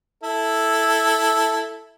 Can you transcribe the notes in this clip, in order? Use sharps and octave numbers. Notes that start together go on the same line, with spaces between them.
E4 A4